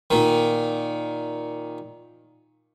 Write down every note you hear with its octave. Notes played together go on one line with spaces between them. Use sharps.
A#2 D#3